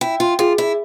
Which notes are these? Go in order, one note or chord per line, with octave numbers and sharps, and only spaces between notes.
E4 G5
F4
F4 G#4
E4